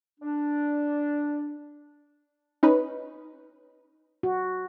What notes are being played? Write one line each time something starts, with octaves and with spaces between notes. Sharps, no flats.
D4
C#4 D#4 B4
F#4